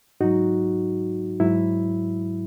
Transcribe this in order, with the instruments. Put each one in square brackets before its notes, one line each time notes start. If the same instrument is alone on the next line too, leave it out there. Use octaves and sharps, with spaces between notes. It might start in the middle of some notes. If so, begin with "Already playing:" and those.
[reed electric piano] G#2 F#3 D#4 F#4
G#2 F#3 E4